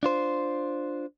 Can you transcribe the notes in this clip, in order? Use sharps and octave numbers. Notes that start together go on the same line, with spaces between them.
D4 F4 C5